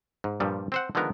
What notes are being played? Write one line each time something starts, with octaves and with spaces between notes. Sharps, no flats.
G#2
G2 A#2 F3 G3
C4 C5 F#5
D3 D#3 F3 G#3 B3 A#4